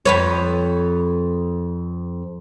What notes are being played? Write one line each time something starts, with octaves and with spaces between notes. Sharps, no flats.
F2 B4 C#5